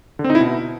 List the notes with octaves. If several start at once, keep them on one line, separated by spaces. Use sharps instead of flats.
D3
C4
D#4
E4
B2